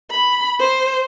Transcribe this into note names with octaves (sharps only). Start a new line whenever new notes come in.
B5
C5